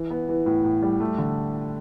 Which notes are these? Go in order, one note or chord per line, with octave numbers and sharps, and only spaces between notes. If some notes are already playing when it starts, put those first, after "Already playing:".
Already playing: E3
B3
E3
A2
A2
G3
A3
D3